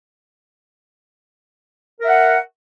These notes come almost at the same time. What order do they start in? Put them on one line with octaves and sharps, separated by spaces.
A#4 E5 F#5